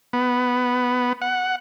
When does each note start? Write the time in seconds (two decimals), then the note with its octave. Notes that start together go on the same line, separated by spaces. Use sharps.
0.13 B3
1.22 F#5